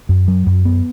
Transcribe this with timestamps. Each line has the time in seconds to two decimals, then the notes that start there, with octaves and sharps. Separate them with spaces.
0.09 F#2
0.28 F#3
0.47 F#2
0.65 B3